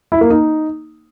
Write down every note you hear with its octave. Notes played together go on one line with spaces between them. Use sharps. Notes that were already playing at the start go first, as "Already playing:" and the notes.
E4
A#3
D#4